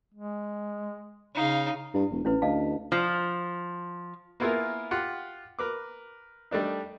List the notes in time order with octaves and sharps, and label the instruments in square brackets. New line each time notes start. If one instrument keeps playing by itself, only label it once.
[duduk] G#3
[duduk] C#3 [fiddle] D#4 F5
[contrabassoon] G2 [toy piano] E4
[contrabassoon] E1
[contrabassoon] A1 [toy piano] C#4 E4 B4
[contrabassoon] D2 [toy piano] D#5 F5 A5
[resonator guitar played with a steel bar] F3
[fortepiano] A#3 B3 E4 F4 G#4 A#4
F4 G4 F#5
A#4 B4 D6
G3 A3 D4 D#4